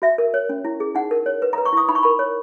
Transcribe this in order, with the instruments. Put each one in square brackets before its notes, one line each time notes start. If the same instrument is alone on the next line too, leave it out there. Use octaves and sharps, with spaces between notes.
[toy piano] F#4 E5
A#4
C#5
C#4
E4
G#4
D#4 F#5
A#4
C#5
B4
B4 A#5
C#6
E4 D#6
D#4 B5
C#6
A#4 B5
C#5